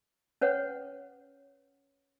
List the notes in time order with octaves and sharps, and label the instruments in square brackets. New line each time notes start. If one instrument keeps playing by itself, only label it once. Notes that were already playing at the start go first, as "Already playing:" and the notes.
[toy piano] C#4 B4 C#5 F#5